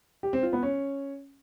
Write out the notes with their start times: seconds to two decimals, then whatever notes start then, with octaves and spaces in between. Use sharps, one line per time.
0.23 G4
0.33 C4
0.43 F4
0.53 B3
0.63 C#4